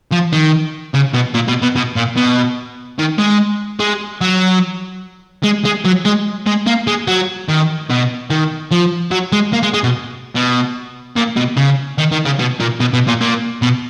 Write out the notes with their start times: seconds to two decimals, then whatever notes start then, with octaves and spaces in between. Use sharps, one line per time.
0.12 F3
0.33 D#3
0.94 C#3
1.14 B2
1.35 A#2
1.48 B2
1.62 B2
1.76 B2
1.96 A#2
2.17 B2
2.99 D#3
3.19 G#3
3.80 G#3
4.21 F#3
5.43 G#3
5.64 G#3
5.85 F#3
6.05 G#3
6.47 G#3
6.66 A#3
6.87 G#3
7.07 F#3
7.48 D#3
7.89 B2
8.30 D#3
8.71 F3
9.11 F#3
9.32 G#3
9.53 A#3
9.63 G#3
9.74 G#3
9.84 B2
10.35 B2
11.16 A#2
11.37 B2
11.57 C#3
11.98 D#3
12.11 D#3
12.25 C#3
12.39 B2
12.60 A#2
12.80 B2
12.93 B2
13.08 A#2
13.21 A#2
13.62 B2